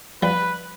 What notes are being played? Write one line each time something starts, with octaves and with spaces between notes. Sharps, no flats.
F3 G3 B4